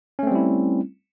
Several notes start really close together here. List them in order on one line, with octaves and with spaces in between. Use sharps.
C#4 A3 C4 G3 E4